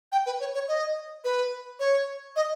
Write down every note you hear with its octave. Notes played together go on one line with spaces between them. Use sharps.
G5
B4
C#5
C#5
D#5
B4
C#5
D#5